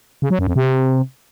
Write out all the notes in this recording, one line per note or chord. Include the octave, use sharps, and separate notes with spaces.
C#3
F#3
F#2
F2
C3